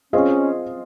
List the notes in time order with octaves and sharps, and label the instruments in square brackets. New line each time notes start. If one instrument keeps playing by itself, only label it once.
[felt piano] C4 F4 G#4 D#5 [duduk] C#4